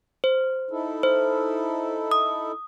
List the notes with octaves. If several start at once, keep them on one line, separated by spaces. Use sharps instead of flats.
C5
D#4 E4 A4
C5
D#6